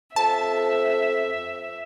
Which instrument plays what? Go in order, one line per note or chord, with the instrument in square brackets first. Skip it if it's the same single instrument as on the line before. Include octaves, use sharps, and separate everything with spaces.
[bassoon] F2 [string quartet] E5 [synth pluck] A5